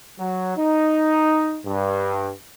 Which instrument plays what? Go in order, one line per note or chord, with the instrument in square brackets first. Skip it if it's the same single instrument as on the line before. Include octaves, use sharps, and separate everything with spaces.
[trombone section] F#3
D#4
G2